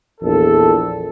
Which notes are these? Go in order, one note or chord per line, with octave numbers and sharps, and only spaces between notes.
A#1 E2 A4